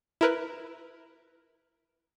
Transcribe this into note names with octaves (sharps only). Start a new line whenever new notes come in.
E4 A#4 B4